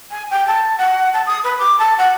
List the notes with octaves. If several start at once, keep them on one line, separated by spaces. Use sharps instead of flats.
G#5
G5
A5
F#5
A5
D#6
B4
D6
A5
F#5